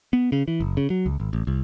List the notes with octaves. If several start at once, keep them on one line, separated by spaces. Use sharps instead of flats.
B3
C#3
E3
F#1
C#3
F#3
C#2
G#1
A1
C2